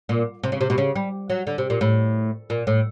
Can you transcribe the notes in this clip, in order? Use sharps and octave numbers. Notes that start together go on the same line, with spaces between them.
A#2
C3
C#3
C3
B2
C#3
G3
F#3
D3
C3
A#2
A2
A#2
A2